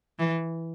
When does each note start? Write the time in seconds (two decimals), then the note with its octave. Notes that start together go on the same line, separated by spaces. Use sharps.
0.19 E3